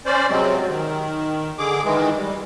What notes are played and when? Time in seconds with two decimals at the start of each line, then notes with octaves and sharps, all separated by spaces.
0.06 C#4 C5 D5
0.30 C3 F#3 G#3 C4
0.70 D#3
1.58 D3 G#4 D6
1.85 D#3 E3 G#3
2.16 G3